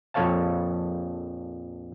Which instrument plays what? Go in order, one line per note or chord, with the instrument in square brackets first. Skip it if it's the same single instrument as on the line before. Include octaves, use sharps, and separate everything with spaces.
[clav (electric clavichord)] A#1 F2 A4 C#5 F5 A5